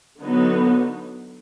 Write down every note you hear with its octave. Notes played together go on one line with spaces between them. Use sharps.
D3 F#3 B3 D#4